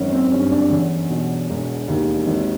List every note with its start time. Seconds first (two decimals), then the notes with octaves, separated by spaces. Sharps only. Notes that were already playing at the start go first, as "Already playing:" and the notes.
Already playing: G#1 F#2 C#4
0.13 C4
0.32 G2 C#4
0.51 D4
0.71 E2 C#4
1.10 B2
1.50 E1
1.88 D#2
2.26 G#1